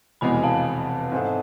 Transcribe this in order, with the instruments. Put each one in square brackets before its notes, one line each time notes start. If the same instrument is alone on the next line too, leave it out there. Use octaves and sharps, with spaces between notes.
[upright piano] F1 E2 B2 G#3 [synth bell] G#5 B5
[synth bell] F5 A5
[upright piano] G#2 G#3 C4 E4 A4